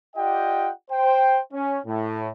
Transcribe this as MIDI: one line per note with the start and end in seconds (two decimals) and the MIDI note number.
0.16 0.70 65
0.16 0.70 67
0.16 0.70 74
0.16 0.70 75
0.16 0.70 78
0.16 0.70 79
0.91 1.39 72
0.91 1.39 79
1.52 1.79 61
1.85 2.30 45